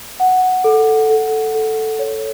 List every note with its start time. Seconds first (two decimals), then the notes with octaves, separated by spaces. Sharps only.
0.20 F#5
0.64 A4
1.10 A4
1.54 A4
1.99 C#5